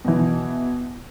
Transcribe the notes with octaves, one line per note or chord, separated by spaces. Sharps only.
B2 E3